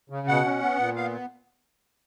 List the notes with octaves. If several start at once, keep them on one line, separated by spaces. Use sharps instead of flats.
C#3
B2 F#5
C#4
B3
A#2
B3 F5